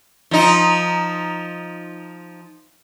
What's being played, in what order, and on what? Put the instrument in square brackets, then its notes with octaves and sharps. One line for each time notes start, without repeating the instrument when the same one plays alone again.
[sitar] F3 D#4